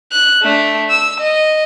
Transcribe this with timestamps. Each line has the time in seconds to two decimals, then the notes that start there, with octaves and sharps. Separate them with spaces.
0.12 F#6
0.43 A3 D4
0.90 E6
1.20 D#5